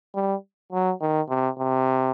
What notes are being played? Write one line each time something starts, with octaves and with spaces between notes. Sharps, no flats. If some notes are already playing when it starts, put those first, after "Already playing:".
G3
F#3
D#3
C3
C3